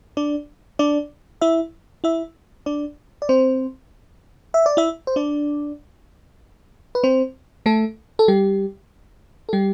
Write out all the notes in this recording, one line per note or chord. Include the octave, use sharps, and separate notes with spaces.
D4 D5
D4 D5
E4 E5
E4 E5
D4 D5
D5
C4 C5
E5
D5
E4 E5
C5
D4 D5
B4
C4 C5
A3 A4
A4
G3 G4
A4
G3 G4